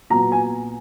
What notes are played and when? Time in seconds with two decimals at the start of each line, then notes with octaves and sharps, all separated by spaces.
0.10 A#2 F#3 B3 A#5
0.32 G#5